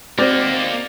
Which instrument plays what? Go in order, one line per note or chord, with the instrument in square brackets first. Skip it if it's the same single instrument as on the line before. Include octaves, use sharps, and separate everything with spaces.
[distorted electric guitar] A#3 D#4 [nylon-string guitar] C4 F#4 [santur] D5